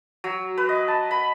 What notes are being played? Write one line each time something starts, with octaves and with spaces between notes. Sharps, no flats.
F#3
B4
D#5
A5
B5